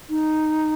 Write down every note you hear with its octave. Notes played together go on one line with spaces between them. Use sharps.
D#4